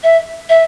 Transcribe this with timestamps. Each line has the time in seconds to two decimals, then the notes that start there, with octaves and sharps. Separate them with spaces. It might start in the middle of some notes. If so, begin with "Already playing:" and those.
0.03 E5
0.49 E5